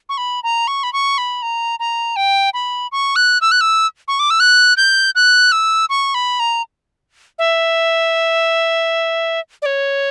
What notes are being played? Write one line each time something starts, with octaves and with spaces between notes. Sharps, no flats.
C#6
B5
A#5
C#6
B5
C#6
B5
A#5
A#5
G5
B5
C#6
F#6
E6
F#6
E6
C#6
D6
E6
F#6
G6
F#6
E6
C#6
B5
A#5
E5
D5
C#5